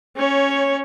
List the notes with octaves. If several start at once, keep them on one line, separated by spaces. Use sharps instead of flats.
C#4 C#5